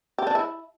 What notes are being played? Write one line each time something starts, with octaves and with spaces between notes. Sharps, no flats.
G4
D4
E4